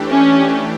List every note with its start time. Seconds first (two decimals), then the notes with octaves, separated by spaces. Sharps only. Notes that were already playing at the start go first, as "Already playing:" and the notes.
Already playing: E3 A3 D4 G4
0.09 C#4